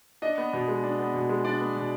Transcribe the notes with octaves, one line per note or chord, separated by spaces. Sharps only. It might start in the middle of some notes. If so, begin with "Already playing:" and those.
D4 D#5
B3
B2
G#3
D4
B3
B2
G#3
D4 D5
B3
B2